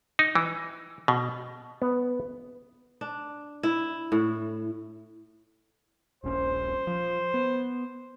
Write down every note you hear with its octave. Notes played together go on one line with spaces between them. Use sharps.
D#4
E3
B2
B3
D4
E4
A2
D#1 A#1 C#4 C5
F3
B3